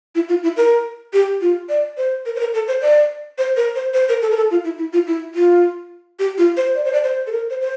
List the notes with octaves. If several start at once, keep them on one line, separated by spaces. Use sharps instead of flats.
E4
F4
E4
A#4
G4
F4
D5
C5
A#4
C5
A#4
A4
C5
D5
C5
A#4
C5
C5
A#4
A4
A#4
A4
F4
E4
E4
F4
E4
F4
G4
F4
C5
D5
C5
D5
C5
A4
A#4
C5
C5